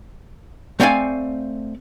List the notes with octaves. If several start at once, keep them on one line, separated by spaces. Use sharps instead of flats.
A3 C4 D5 F5 F#5 G#5